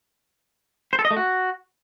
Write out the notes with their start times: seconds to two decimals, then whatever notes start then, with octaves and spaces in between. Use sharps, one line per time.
0.93 C5
0.99 A4
1.05 D#5
1.11 A3
1.17 F#4